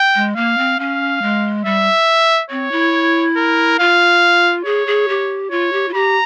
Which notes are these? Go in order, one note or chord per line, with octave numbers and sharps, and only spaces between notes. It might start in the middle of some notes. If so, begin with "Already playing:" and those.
Already playing: G5
G#3
A#3 F5
C4
C#4 F5
G#3
G3 E5
C4 C#5
E4
A#4
F4 F5
G#4 C#5
G#4
G4
F4 C#5
G4
F4
G4 A#5